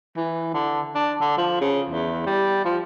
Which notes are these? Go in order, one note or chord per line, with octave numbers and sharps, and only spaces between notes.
E3
D3
D4
D3
F3
C#3
E2
G3
F3